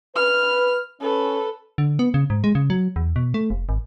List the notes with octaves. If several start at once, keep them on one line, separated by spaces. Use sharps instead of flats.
B4 F6
C#4 A4 B4
D3
B3
C#3
G#2
G#3
C#3
F#3
E2
B2
A3
F1
G#1